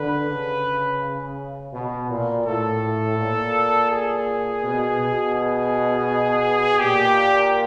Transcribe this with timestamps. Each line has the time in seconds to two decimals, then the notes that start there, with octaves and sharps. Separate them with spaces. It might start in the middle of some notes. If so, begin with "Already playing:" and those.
Already playing: D3 B4
0.29 C#3
1.73 B2
2.10 A#2
2.46 A2 A4
3.18 A#2
3.90 G#4
4.63 B2
4.99 B2
5.35 G#4
6.79 A#2 G4